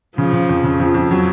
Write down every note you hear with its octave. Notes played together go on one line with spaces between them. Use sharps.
C#3 F3
C#3
F2
C#3
F2
F2
F#3